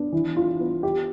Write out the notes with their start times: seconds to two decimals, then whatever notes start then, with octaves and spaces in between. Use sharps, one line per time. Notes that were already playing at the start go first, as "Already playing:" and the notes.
Already playing: B3 D4
0.12 E3
0.37 F4
0.60 B3
0.83 G4